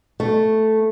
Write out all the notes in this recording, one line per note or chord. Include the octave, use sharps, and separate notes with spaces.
A3